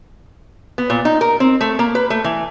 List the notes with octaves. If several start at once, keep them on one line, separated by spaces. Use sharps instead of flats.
B3
A#2
D#4
A#4
C4
A3
A#3
B4
A3
E3